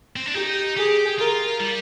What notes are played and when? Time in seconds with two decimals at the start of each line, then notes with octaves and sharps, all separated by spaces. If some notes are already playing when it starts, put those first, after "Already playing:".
0.16 C4
0.26 D4
0.34 D#4 G4
0.77 G4 G#4
1.19 F4 A#4
1.60 G3